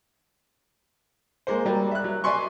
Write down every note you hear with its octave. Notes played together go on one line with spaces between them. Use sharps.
G#3 A#3 C5
F#3 G3 A#3
E5 F#6
F#3
D5 E5 G#5 C6 C#6